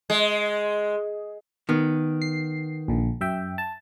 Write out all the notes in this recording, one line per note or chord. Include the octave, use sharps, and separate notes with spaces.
G#3
D#3 B3
C7
A#1 D3
F#2 E5 G5
A5